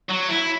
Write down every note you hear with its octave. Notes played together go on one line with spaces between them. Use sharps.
F#3
E4